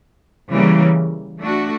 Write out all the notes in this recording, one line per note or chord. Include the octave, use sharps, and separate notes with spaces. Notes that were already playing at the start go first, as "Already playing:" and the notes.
C#3 E3 G3 A#3
A3 D4 F#4